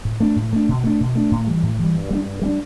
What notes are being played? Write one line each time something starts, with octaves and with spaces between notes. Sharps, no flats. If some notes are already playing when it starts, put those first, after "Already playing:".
A2
A3 D4
A2
A3 D4
B2
A3 D4
B2
A3 D4
A2
E3 G3
A2
E3 G3
G2
G3 B3 D4
G2
G3 B3 D4